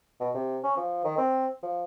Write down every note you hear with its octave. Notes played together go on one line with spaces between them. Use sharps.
B2
C3
C#4
F3
D#3
C4
F3